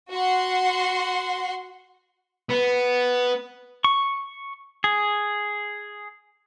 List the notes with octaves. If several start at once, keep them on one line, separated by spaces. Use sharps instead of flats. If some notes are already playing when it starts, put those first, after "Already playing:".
F#4 F#5 C6
B3
C#6
G#4